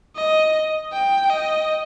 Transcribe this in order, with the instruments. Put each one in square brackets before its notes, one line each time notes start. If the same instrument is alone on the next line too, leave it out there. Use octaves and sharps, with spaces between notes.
[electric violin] D#5
G5
D#5